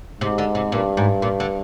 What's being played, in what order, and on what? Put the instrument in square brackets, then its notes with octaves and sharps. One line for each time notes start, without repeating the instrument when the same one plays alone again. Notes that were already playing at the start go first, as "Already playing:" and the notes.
[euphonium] G#2 [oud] C3
[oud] D3
C3
[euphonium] G2 [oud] A#2
[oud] G#2
A#2
D3